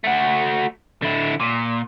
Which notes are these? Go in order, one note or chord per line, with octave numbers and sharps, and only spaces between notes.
A3 F#4
D3 E4
A#2